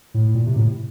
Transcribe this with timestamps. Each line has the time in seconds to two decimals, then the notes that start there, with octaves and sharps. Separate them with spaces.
0.14 A2
0.35 A#2
0.46 C3
0.56 A2